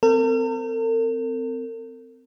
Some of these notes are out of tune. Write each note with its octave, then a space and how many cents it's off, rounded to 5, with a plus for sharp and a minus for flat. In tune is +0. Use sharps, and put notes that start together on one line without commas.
C4 -25 A#4 -45